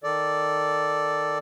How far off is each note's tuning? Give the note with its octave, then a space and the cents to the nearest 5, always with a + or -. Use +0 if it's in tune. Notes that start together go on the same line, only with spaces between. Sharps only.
D#3 +0 A4 +0 D5 +0